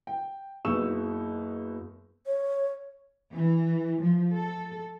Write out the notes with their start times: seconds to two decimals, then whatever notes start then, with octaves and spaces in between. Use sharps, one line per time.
0.07 G5
0.65 F#1 B2 D#4 C#6 E6 E7
2.26 C#5
3.33 E3
4.02 F3
4.34 A4